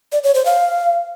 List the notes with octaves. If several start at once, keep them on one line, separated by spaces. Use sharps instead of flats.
D5
C#5
C5
F5